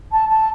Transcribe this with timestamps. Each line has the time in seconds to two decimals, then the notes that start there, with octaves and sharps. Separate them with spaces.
0.11 A5
0.28 A5